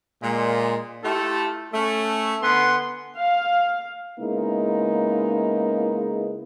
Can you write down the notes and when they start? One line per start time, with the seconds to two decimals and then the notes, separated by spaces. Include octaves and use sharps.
0.23 A#2 G#3
1.04 A3 E4 F4 G4 A4
1.73 A3 C#4
2.42 D3 B3 B4 F#5 G#5 C6
3.15 F5
4.20 C#3 G#3 A#3 B3 D#4 E4